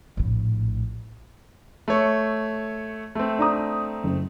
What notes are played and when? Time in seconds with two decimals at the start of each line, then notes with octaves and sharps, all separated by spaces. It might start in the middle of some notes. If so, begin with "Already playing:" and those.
0.17 A#1 A2
1.88 A3 C#5
3.15 A3 C4
3.39 D4 A#5 D#6
4.04 F#1